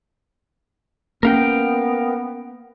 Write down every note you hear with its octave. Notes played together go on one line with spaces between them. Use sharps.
A#3 B3 C#4 A#4 F5 G5